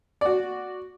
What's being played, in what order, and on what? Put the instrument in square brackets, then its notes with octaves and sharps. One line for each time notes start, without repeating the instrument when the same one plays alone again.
[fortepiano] F#4 D5